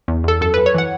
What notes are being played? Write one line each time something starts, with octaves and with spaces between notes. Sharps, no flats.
E2
E2 A4
F#2 A4
F#2 B4
C#5
E3 F#5